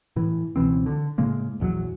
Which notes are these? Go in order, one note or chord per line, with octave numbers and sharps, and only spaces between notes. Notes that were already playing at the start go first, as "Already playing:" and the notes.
A2 E3
C#2 B2 E3 C4
D3
A2 C#3 G#3 A#3
A#1 E2 D#3 F#3